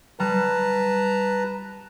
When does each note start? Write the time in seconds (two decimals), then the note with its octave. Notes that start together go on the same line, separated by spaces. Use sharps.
0.20 G3 B4 A5 A#5